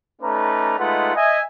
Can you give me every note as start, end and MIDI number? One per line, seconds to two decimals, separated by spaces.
0.22 0.75 57
0.22 0.75 61
0.22 0.75 63
0.22 0.75 71
0.22 0.75 74
0.22 0.75 82
0.78 1.11 56
0.78 1.11 57
0.78 1.11 63
0.78 1.11 65
0.78 1.11 71
0.78 1.11 78
1.15 1.39 75
1.15 1.39 76
1.15 1.39 80